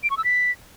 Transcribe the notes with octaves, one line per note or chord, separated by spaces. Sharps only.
D7
C#6
E6
B6